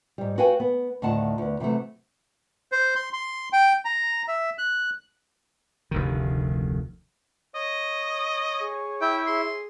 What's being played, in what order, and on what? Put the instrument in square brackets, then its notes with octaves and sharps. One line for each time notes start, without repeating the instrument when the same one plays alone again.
[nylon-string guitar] G#2 G3
F#4 B4 C#5 F5 G5 G#5
B3
D2 A2 D#3 F4 F#5 A5
D2 B3
C3 E3 F#3 A3
[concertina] C5
C6
C6
G5
A#5
E5
F#6
[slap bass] F1 D2 D#3
[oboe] C#5 [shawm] D#5
[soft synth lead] G#4
[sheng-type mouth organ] E4 E5 [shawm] G5
[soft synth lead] G#4 [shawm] C6